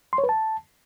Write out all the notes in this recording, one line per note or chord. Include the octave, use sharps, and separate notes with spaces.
C6
C#5
B4
A5